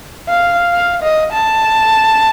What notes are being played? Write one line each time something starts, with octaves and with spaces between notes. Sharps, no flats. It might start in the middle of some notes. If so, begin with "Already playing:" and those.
F5
F5
D#5
A5